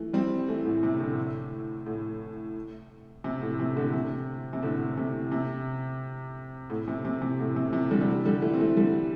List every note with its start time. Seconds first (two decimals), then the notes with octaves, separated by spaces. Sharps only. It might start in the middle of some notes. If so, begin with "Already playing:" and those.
Already playing: E3 A3
0.13 G3 C4
0.49 E3 A3
0.65 A2
0.83 C3
1.00 A2 D3
1.86 A2
3.24 C3
3.42 A2
3.60 C3
3.76 A2 D3
3.94 C3
4.53 C3
4.63 A2 D3
4.97 C3
5.32 C3
6.70 A2
6.88 C3
7.05 C3
7.22 C3
7.40 A2
7.56 C3
7.73 C3 E3
7.91 D3 G3
8.01 G3
8.08 E3 A3
8.25 D3 G3
8.42 E3 A3
8.53 C4
8.60 E3 A3
8.77 D3 G3